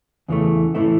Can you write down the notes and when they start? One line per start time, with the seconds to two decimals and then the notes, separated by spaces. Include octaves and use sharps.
0.28 E2 C#3 E3 A3
0.75 A2 E3 A3 E4